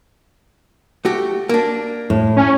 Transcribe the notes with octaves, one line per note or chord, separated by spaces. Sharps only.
A3 F#4 G4
A#3 D4
A2
C#4